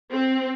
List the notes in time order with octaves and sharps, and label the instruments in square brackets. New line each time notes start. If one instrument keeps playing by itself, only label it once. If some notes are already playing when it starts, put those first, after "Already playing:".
[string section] C4